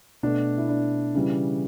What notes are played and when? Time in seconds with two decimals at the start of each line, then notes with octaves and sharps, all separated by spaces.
0.23 B2 A3 D4
0.57 E4
0.69 D4
1.15 C#3 E3 G3